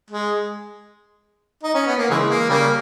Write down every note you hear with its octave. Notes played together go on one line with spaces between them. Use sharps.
G#3
D#4
C#4
B3
A#3
C#3 E3 G#3
A#3
C#3 G3 A#3